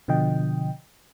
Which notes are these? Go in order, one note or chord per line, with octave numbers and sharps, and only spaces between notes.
B2 D3 F3 D#5 G5